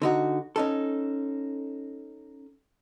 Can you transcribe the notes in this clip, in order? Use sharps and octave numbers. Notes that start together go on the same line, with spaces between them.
D3 D#4 F#4
C#4 D#4 A4